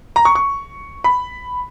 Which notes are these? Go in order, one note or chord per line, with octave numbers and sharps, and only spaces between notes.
A#5
C#6
C#6
B5